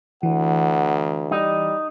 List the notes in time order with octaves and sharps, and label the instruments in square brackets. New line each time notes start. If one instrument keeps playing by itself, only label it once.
[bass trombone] D2 [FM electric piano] E3 [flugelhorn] F#5
[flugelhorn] G3 [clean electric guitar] D#4